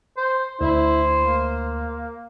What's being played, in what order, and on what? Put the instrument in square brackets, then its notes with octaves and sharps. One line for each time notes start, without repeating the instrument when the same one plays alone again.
[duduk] C5
[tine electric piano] D2 [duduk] E4 [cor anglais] C5
[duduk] A#3